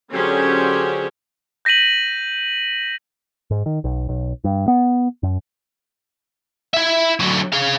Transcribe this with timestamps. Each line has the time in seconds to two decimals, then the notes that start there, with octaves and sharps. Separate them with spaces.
0.12 D3 F#3 C#4 G4 G#4 C5
1.65 G6 A#6 B6 D#7 F#7
3.51 G#2
3.66 D#3
3.84 B1
4.09 B1
4.44 G2
4.68 B3
5.23 F#2
6.74 E4 E5
7.20 D3 F#3
7.53 G#4 F5